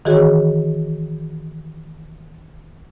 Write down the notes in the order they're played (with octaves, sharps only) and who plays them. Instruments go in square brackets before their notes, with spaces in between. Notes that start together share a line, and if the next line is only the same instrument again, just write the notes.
[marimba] D#3 E3 F#4 G#4 C#5